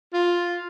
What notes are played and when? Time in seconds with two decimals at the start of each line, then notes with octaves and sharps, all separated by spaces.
0.13 F4